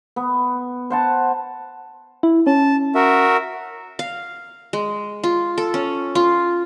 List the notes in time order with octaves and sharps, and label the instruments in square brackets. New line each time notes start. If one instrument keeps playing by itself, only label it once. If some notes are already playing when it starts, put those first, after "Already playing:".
[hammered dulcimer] B3
C5 F#5 A5
[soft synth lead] E4
[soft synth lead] C#4 [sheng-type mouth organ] A5
[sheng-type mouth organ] F#4 A#4 E5
[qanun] F5
G#3
F4
A4
C#4
F4